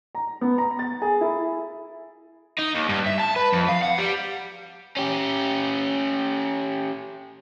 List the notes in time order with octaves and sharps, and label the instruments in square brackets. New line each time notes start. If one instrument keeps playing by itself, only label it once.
[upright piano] A#5
B3
A#5
A6
G#4
E4
[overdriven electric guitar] D#4
D#2
G2
E5
A5
B4
F2
F5
F#5
G3
C#4 G4